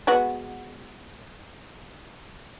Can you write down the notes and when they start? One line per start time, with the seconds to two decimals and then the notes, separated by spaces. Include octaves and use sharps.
0.07 G#3 B3 F#4